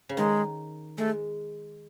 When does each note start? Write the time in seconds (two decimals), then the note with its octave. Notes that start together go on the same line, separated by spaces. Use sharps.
0.09 C#3
0.17 D#3 G#3
0.98 G#3 A3